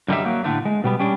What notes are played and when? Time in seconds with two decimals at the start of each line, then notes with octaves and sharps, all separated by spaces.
0.08 F#2 D3 G3 D#4 G4 E5
0.24 F#3 A#3
0.44 A2 D3 A3
0.65 G#3
0.84 B2 G3 B3
0.99 G3 C#4 D4